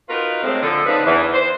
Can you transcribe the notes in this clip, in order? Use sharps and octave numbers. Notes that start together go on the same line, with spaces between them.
D#4 F4 F#4 A#4 B4
A2 G#3 C4
D3 F3 A4
C#3 B3 C4 D4 D#4 B4
E2 E3
C5